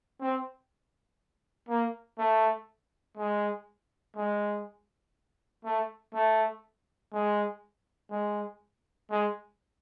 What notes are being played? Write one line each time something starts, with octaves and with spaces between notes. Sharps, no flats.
C4
A#3
A3
G#3
G#3
A3
A3
G#3
G#3
G#3